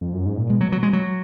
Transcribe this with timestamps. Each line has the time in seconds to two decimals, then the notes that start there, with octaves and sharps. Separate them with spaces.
0.01 F2
0.14 F#2
0.26 G#2
0.37 A#2
0.50 B2 G#3
0.61 F#3
0.72 F#3
0.83 G#3
0.93 F#3